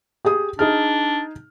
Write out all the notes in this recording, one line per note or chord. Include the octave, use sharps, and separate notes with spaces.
G4 G#4 D#6
D4 D#4 G#4 F6